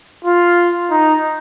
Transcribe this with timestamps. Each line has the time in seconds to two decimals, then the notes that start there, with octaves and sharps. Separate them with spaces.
0.25 F4
0.91 D#4